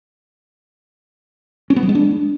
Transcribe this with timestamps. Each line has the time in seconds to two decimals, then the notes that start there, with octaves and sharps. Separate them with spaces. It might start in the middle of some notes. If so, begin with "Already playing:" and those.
1.70 C#4
1.76 B3
1.83 F#3
1.89 G#3
1.95 D4